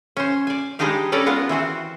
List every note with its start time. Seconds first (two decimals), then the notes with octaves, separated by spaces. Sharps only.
0.17 C#4 C5
0.47 D5 G#5
0.79 G3 G#3 D4 D#4 G4 F5
1.12 C#4 A4 B4 D5 A#5
1.26 G#3 B3 F4 A#4 F#5
1.49 E3 C4 F#4 C5